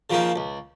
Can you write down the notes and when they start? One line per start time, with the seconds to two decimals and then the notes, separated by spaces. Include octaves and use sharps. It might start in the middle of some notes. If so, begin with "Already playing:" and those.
0.10 C#3 F3 A#3 D#4
0.36 C#2